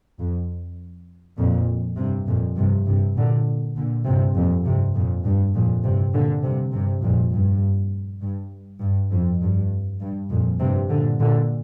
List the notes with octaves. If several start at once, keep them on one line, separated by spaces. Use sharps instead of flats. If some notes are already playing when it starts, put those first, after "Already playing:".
F2
F2 A#2
G2 C3
F2 A#2
G2 C3
G2 C3
A#2 D3
A#2 D3
G2 C3
F2 A#2
G2 C3
F2 A#2
G2
F2 A#2
G2 C3
A#2 D3
G2 C3
G2 C3
F2 A#2
G2
G2
G2
F2
G2
G2
F2 A#2
G2 C3
A#2 D3
A#2 D3